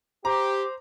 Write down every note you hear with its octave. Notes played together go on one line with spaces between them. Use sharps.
G4 C5 A#5 D6